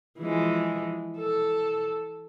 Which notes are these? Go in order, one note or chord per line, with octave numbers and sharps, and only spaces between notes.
E3 F3 G#3
A4